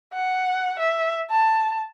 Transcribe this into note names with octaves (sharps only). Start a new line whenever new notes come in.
F#5
E5
A5